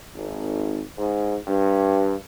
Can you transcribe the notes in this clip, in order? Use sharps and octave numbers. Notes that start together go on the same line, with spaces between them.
G#1
G#2
G2